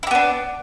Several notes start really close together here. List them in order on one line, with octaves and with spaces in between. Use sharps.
E4 G4 B3 D4